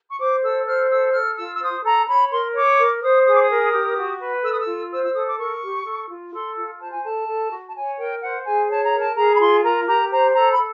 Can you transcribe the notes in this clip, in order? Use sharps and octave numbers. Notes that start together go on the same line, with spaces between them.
C#6
C5 D6
A4 E6
C5 F6
A4 E6
E6
A4 F6
F4 E6
E6
C5 D#6
A4 A#5
C#5 B5
A#4 C6
C#5 D6
A#4
C5 D#6
G#4 D#6
D6
D#6
A#4
G4
F#4
B4
A4 E6
D#6
E6
F4
C5 E6
E6
A4 D#6
D6
A#4 C#6
G4
A4
F4
A4 C6
F4
C5 A5
G#5
A4 A5
A4
F#4
A5
C#5 G#5
A#4 G5
C5 F#5
G#4 G#5
C#5 A5
A#5
A#4
A5
G#4 A#5
B5
F4 C6
A#4 A#5
G4 A#5
C5 A#5
A4 A#5
B5
A4